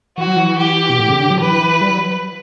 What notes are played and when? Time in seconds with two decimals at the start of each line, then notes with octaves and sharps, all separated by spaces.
0.18 E3 F#4
0.27 F#3
0.36 E3
0.58 G4
0.90 B2
0.99 A2
1.10 C#3
1.20 D3
1.30 F#3
1.40 E3 B4
1.81 G3
1.90 F#3